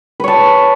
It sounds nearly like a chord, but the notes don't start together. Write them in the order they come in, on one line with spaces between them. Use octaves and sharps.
B4 C#5 A5